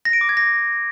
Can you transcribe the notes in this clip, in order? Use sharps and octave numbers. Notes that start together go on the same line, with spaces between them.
A#6
D7
D6
G#6
A#6